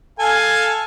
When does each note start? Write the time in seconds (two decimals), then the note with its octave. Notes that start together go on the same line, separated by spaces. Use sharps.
0.19 A4 F5 G#5